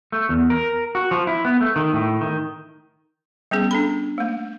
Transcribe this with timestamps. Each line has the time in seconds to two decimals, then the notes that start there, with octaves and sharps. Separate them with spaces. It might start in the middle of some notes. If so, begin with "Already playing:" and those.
0.12 A3
0.29 E2
0.50 A#4
0.95 F#4
1.11 F3
1.27 E4
1.45 B3
1.60 A3
1.76 D#3
1.93 A2
2.21 D#3
3.51 G3 B3 C#4 G#4
3.71 D4 A4 B5
4.18 A3 A#3